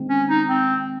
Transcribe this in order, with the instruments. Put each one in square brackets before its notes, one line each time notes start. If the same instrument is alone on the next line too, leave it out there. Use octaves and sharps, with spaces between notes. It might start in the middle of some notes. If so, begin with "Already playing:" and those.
Already playing: [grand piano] D#3 G#3 C4 D#4
[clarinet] C#4
D#4
C4